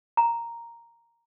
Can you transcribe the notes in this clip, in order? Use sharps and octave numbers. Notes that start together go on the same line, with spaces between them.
A#5